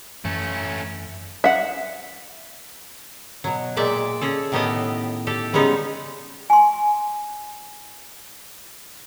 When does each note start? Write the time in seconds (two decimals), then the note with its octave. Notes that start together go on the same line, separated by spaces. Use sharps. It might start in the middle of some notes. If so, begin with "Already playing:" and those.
0.25 F#2 E3 A3 C#4
1.44 E5 F#5
3.44 B2 F#3
3.77 A#2 G#3 D5 E5 G5
4.21 C#4 G#4 A4
4.52 A2 D#3 B3 G4 A4 D#5
5.27 G4 A4
5.53 C#3 G3 G#3 B3 C#4 D#4
6.50 G#5 C6